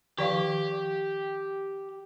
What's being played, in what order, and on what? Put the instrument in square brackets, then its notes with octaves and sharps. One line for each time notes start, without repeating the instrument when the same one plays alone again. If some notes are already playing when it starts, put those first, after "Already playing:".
[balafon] D#3 F3 F5 [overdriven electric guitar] G4